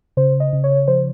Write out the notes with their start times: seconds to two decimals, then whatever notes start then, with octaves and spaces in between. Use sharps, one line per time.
0.17 C#3 C5
0.40 D#5
0.53 C#3
0.64 C#5
0.88 F3 C5